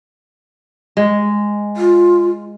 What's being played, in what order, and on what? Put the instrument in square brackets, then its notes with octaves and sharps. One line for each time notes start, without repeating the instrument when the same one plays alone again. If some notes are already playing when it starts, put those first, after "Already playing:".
[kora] G#3
[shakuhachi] F4